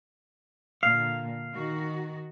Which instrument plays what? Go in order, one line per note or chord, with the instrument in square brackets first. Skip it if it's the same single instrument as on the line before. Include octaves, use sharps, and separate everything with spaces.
[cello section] A#2 D3 [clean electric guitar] F5
[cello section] D#3 F#4